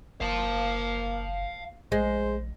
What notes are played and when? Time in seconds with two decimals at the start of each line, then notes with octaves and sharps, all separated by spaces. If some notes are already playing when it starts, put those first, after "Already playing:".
0.21 F#1 A#3 F5 A5
1.92 A#1 G#3 C5